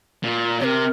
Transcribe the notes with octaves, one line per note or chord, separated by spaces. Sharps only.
A#2
C3 A#4 C#5